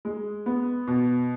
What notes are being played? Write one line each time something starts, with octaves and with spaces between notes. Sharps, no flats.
G#3
B3
B2